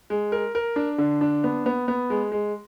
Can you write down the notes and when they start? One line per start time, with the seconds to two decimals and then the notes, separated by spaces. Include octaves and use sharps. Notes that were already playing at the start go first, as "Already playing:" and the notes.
0.10 G#3
0.32 A#4
0.55 A#4
0.76 D4
0.98 D3
1.21 D4
1.44 B3
1.66 B3
1.88 B3
2.10 G#3
2.32 G#3